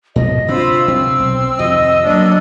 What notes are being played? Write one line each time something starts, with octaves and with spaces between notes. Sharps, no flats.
G#2 B2 D3 D#5
C3 C4 D4 F4 C5 B5 E6
C3 C4
B1
F2 C3 D#3 D#5
F#3 A3 A#3 D4 D#5